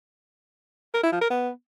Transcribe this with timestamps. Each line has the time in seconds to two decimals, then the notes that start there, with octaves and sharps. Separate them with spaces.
0.94 A#4
1.03 E4
1.12 F3
1.21 A#4
1.30 B3